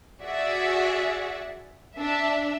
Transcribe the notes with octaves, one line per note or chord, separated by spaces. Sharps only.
F#4 G#4 D5 E5 F#5
D4 E5